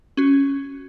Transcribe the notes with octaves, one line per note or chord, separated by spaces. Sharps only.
C#4 F#4